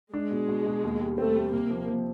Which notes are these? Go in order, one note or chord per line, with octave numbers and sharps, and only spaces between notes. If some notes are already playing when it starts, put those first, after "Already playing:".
G#3 D4
B2
B2
B2
D#2
G3
A3 C4
G3
C3 A#3
F3
F3